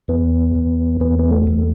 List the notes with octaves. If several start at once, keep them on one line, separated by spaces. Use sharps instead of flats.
E2 B3
E2
E2 B3
B3
A3
E2